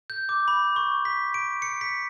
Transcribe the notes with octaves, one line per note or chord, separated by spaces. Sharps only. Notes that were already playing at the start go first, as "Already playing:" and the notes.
G6
D6
B5
C#6
B6
D7
C#7
B6